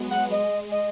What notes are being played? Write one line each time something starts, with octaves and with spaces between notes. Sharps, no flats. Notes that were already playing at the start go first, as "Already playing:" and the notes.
Already playing: F#3 G#3 B3
F#5
G#3 D#5
D#5